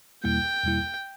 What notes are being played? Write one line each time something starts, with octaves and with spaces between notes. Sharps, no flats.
E2 B2 G3 A#3 E4 G5
E2 B2 G3 A#3 E4